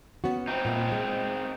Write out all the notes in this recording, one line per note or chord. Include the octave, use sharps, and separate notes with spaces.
B3 C#4 F#4
C4 D#4
A#2
G#3